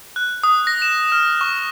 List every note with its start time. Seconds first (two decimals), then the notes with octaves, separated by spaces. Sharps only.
0.16 F#6
0.44 D#6
0.67 A#6
0.82 E7
1.12 F6
1.41 C#6